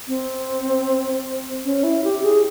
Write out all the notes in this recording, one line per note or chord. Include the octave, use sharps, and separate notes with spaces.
C4
C#4
E4
G4
G#4